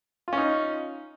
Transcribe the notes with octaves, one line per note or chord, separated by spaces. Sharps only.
C#4 D#4 F4